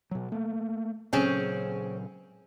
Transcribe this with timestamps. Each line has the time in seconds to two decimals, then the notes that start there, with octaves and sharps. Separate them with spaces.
0.11 B2 F#3
0.32 A3 A#3
1.13 A#2 C#3 F#3 C4 C#4 G#4